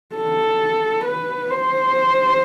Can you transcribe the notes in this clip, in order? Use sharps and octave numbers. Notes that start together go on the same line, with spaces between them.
A4
B4
C5